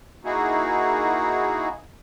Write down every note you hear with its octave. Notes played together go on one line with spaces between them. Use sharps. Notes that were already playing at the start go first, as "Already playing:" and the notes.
A#3 D#4 E4 F#4 G#4